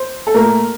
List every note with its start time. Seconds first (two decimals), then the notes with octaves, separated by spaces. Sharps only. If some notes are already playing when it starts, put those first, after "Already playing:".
Already playing: C5
0.27 A4
0.34 A#2 A3 A#4